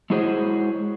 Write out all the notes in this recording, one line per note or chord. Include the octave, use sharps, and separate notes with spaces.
G#3 E4 F#4 G#4 C5 C#5